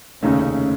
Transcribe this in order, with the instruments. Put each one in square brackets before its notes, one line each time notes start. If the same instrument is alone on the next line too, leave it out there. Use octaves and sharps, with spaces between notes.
[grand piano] F1 D#2 C#3 A3 D#4 [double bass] C#4